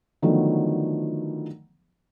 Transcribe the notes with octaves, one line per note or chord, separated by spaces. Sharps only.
D3 D#3 F3 F#3 A3 B3